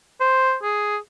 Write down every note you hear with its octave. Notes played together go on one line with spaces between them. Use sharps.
C5
G#4